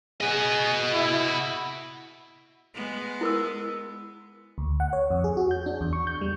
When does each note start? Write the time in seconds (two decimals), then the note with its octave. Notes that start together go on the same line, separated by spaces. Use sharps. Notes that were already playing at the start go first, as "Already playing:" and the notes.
0.20 F#4 G#4 D#5
0.94 E4
2.74 G#3 B3
3.21 E4 A#4 E6
4.58 D2
4.80 F#5
4.93 C#5
5.11 F2
5.24 G#4
5.37 F#4
5.51 G6
5.66 D4
5.81 E2
5.93 C#6
6.07 G6
6.21 G3